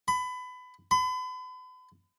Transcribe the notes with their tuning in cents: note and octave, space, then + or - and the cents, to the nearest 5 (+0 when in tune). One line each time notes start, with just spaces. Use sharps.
B5 +25
B5 +40